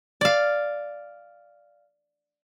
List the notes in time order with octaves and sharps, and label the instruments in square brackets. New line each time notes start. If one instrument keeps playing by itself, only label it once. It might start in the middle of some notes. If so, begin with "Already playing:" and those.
[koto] D5 F5